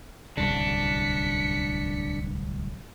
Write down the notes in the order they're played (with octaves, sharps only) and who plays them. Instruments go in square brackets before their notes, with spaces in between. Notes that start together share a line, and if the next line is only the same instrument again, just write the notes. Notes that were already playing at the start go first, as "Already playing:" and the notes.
[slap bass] D1 C2 C#3 [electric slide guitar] D4 [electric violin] B6 C#7